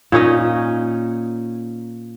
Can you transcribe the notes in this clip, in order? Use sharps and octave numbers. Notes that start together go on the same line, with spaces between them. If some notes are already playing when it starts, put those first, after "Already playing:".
A#2 C#4 D#4 D#5